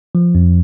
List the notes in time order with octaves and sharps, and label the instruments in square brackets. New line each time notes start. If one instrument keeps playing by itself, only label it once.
[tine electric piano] F3
F2